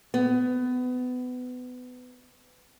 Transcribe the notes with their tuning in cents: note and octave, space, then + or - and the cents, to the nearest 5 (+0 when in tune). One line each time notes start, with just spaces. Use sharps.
B3 +25